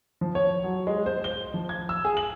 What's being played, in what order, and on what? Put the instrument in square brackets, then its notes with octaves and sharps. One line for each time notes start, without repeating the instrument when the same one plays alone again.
[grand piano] F3
C#5
F#3
G#3
C5
G7
F3
G#6
E6
G#4
F#7